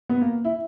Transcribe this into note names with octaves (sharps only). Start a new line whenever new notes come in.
B3
A#3
E4